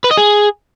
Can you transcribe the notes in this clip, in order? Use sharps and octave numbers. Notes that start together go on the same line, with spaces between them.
B4
D#5
G#4